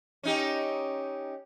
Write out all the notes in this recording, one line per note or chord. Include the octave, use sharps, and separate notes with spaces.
C#4 D#4 G4